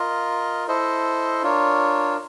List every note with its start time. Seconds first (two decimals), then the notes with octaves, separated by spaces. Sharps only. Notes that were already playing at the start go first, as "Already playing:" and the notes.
Already playing: F4 A#4 D#5
0.68 E4 A4 C5 D#5
1.42 D4 F4 A#4 C#5